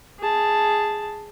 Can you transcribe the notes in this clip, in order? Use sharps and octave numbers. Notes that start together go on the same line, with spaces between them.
G#4 A5